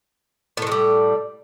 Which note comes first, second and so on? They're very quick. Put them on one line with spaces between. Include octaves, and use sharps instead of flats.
A2 D#3 G#3 G3